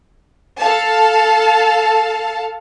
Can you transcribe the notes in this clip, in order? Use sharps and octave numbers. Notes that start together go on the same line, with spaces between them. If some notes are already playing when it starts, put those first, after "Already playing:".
A4 F5 A5